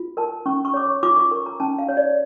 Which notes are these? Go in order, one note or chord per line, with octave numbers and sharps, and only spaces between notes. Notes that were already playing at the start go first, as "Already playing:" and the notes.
Already playing: F4
A#4 A5
C#4 C#6
C#6
C#5 D6
C#6
F4 D6
C#6
D6
A#4 C#6
A#5
C#4 A5
F5
C#5
D5